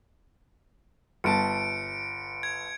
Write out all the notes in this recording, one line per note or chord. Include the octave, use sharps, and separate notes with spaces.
G1 A5 C#7 D7
G#6